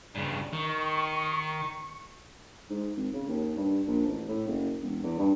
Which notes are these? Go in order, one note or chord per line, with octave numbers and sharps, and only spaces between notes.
G2 C#3
D#3 C#6
G#2
G#1
C#3
D#2
G2
A#1
A1
A2
F#1
E1
E2
G2